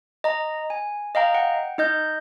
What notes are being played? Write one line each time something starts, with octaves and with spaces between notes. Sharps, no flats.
D#5 A#5
G#5
D#5 F5 G5 A#5
F#5 G5
D#4 D#5 G6